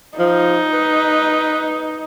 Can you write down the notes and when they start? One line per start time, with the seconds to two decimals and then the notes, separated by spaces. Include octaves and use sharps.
0.19 F3 D#4
0.73 B4